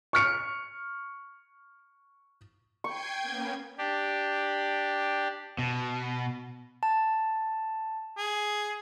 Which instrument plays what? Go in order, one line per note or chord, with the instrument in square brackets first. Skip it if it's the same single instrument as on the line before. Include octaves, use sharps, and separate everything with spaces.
[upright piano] C#6 F6 C#7
[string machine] G5 G#6 [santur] C#6 [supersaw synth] G6 C7 D#7
[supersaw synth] A#3 B3 C#4
[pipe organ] D4 G4
[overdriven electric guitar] B2
[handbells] A5
[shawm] G#4